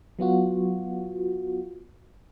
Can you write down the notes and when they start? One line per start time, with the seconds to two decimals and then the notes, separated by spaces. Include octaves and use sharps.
0.19 F#3 B3 F4 F#4